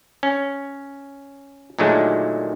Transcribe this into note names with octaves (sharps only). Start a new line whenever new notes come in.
C#4
A#2 D3 D#3 F#3 G#3 A3